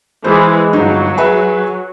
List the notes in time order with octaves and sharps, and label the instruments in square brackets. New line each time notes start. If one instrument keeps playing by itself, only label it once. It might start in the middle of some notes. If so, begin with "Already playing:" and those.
[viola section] E3 G#3 G#4 [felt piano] C5
[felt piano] G1 D#4 [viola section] F#3
[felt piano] G#4 B4 E5